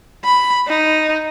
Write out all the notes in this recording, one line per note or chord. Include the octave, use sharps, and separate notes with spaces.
B5
D#4